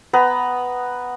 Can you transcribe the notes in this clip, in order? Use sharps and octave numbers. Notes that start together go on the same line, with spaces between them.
B3 B4 A#5